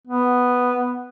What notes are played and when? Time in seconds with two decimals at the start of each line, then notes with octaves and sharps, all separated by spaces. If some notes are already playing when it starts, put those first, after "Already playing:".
0.07 B3